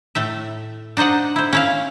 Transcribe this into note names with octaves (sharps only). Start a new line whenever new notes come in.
A2 A3 E5
D4 D#4 C5 D#5 F#5
E4 C5
C#4 E4 F5